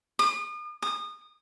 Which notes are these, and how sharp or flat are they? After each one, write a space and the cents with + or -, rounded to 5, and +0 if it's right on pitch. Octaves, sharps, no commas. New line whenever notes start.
D#6 -45
D#6 -25